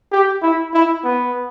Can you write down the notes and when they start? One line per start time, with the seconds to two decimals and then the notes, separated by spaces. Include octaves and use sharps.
0.12 G4
0.42 E4
0.73 E4
1.04 B3